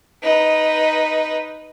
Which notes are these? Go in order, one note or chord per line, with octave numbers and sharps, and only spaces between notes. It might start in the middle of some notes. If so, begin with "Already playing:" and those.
D#4 B4